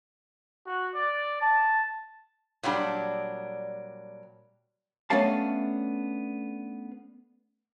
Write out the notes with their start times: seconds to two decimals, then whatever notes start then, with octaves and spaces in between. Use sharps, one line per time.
0.66 F#4
0.95 D5
1.41 A5
2.63 A#2 F#3 G3 D4
5.10 A3 B3 C#4 D4 F5 A5